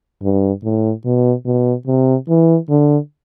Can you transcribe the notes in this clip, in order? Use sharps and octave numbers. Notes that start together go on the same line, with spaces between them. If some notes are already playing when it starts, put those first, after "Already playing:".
G2
A2
B2
B2
C3
E3
D3